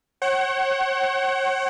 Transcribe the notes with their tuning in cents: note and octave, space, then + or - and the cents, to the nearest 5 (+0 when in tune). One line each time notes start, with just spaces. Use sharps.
C#5 -40 F#5 +35